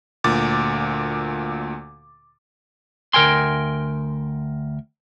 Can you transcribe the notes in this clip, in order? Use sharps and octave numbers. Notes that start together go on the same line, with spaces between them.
D2 A#2 D6 A6
D2 A#4 G5 G#5 C6